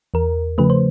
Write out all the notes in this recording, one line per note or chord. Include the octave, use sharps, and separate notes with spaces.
E2 A#4
C#3 F3 A3 B4
C5